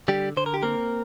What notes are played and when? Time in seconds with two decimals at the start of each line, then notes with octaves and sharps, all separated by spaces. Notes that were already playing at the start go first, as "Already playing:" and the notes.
0.08 D3 G3 G4
0.37 D3 C5
0.46 A#4
0.54 G4
0.63 A#3 C4 A#4